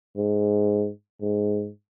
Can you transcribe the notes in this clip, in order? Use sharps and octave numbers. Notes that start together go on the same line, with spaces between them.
G#2
G#2